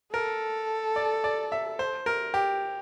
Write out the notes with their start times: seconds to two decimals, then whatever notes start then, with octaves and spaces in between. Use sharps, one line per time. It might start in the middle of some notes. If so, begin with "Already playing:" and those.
0.13 A4 A#4
0.96 D5
1.24 D5
1.52 E5
1.79 C5
2.06 A#4
2.34 G4